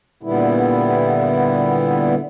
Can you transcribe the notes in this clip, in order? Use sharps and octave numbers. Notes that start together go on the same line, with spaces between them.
A#2 D3 G3 B3 E4